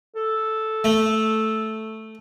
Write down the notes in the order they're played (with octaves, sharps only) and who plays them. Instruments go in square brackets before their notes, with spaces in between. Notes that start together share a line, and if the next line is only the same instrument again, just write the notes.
[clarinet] A4
[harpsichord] A3